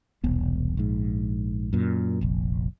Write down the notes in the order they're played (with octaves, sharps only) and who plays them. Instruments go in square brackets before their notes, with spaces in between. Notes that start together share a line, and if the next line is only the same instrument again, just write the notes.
[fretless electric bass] E1 C2 B3
A#1 G#2
F#2 A#2
F1 A#1